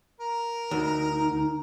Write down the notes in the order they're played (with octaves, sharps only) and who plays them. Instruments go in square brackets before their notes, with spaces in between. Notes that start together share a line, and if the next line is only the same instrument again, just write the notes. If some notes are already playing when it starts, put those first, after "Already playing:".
[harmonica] A#4
[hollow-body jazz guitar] D2 [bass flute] D#4